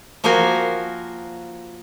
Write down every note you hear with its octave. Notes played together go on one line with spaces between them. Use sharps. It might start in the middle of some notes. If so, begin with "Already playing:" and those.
F3 A#3 F#4 A#4 C5 G#5